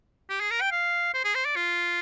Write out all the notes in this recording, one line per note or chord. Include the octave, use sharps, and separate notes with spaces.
G4
G#4
A#4
G5
F5
C5
G#4
C5
D5
F4